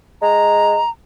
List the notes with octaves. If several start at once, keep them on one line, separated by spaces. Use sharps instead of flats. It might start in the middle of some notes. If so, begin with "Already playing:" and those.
G#3 A#5